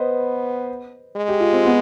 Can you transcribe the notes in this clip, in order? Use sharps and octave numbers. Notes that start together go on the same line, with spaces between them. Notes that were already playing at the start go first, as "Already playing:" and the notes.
Already playing: B3 B4 C5 D#5
G#3
G4
F4
C4
B3